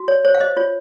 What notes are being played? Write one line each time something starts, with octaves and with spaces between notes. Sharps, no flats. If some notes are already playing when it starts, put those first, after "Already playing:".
Already playing: F#4
C#5
C5 C#5
F5
C5 D#5
F4 C#5